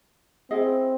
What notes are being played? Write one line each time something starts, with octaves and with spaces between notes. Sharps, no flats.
C4 E4 G#4 D#5